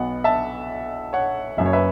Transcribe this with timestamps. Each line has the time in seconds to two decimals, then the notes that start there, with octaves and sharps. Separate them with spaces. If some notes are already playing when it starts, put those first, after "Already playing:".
Already playing: B1 B2 B3 F#5
0.24 E5 A5
1.13 C#5 F#5
1.57 F#1 F#2 F#3 E5
1.66 C#5
1.73 B4 E5